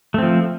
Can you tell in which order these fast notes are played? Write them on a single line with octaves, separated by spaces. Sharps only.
A3 C4 F3